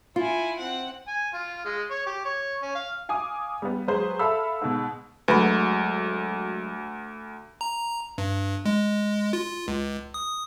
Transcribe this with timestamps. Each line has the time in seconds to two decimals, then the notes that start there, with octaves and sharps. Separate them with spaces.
0.16 E4 F4 G#5
0.58 C4 F#5
1.08 G#5
1.34 F4
1.65 G#3
1.91 C#5
2.06 G4
2.25 C#5
2.62 C#4
2.75 F5
3.09 F5 G#5 D6 D#6
3.62 G3 B3
3.87 F#3 G#3 G#4 B4 C5
4.19 A4 E5 F5 B5 E6
4.61 G#2 B2
5.28 D2 F#3 G#3 B4 B5
7.61 A#5
8.18 G2
8.65 G#3
9.33 F4
9.68 C#2
10.14 D#6